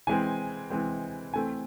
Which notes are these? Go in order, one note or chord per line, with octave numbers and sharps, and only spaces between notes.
E3 G#3 C4 G#5
E3 G#3 C4
E3 A3 C4 G#5